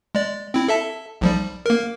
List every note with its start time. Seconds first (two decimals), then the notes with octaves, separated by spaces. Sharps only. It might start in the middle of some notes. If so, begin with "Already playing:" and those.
0.15 G#3 D5
0.54 C4 E4
0.68 A4 E5 A5
1.21 B1 F3 G3
1.66 A#3 A#4